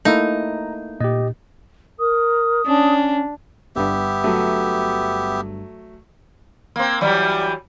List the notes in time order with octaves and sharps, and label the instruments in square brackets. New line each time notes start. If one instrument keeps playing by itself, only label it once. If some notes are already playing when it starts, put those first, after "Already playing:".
[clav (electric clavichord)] A3 A#3 E4 [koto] D#4 [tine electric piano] A#5
[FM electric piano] A#2 [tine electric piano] G4 D#5
[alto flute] A#4 [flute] D#6
[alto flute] C#4 [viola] D4
[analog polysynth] G1 G2 [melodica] B3 G4 E5
[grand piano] F#3 A3
[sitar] A#3 C4
E3 F#3 G3